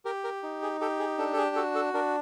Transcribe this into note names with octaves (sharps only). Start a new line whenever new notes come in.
G4 A#4
A#4
D#4
G#4
G4 A4
G#4
D4 A4
A4
G#4
F#4 A4
A4
D4 A#4